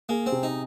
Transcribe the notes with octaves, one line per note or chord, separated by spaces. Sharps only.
A#3 G#4
C4
C3
D#4